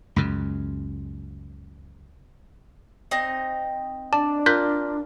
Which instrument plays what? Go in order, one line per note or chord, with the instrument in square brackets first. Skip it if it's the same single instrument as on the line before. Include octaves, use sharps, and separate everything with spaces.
[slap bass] C#2 F#2 C#3
[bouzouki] C4 D#4 D#5
[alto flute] D4 [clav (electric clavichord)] D5 [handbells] A5
[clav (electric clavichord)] F4 A#4 [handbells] F#6 G6 B6